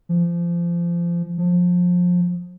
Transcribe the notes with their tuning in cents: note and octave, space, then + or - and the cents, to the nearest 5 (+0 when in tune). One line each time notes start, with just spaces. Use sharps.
F3 -25
F3 +25